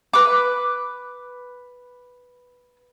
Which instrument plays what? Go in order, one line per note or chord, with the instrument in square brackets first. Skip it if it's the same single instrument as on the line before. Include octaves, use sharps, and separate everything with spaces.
[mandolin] B4 D6